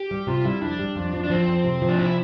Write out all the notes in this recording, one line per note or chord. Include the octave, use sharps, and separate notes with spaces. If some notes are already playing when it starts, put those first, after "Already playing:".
Already playing: G4
G3
C3 F4
G3 E4
F2 D4
G3
F2
F3
D4
F3 C4
F2
C3
F3
D4
C3 E4